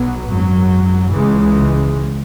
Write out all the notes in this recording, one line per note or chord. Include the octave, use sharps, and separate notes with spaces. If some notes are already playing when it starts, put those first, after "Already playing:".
Already playing: B1 B2 F#3 B3
G#1 F#2 F#3
C#2 C#3 E3 G#3